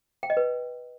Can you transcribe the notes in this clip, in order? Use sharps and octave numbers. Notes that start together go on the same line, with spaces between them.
G5
D#5
B4